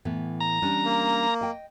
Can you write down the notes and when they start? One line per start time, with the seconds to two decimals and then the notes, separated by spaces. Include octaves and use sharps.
0.05 A2 E3 B3
0.41 A#5
0.62 G3 C#4 D4
0.85 A#3
1.41 D#5 G5